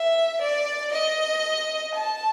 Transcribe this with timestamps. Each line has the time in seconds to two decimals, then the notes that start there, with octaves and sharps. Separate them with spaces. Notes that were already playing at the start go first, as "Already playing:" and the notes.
Already playing: E5
0.42 D5
0.93 D#5
1.95 A5